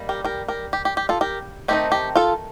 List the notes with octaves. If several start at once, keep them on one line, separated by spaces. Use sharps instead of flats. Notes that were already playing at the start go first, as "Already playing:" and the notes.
Already playing: D#3 G3 A#3
G4 A#4
G4 A#4
G4 A#4
G4
G4
G4
F4 A4
G4 A#4
D#3 A3 C4 D#4 G4
G4
F4 A4